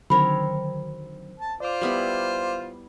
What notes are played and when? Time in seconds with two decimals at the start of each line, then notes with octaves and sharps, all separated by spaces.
0.10 D3 D#3 F#3 C4 A#4 C#5 B5
1.40 A5
1.60 F4 C5 D5 D6
1.81 G3 B3 E4